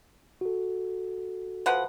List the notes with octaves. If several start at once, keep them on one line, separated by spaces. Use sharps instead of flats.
F#4 A4
F3 B4 F#5